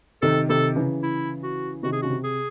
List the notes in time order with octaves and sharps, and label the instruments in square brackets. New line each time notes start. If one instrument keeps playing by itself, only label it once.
[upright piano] C3 D#3 [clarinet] A4
[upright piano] C3 D#3 [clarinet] A4
[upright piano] C#3 E3
[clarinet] E4
F#4
[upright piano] C3 D#3 [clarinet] F#4
[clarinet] G#4
[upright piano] C#3 [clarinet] F#4
[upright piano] C3
[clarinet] G#4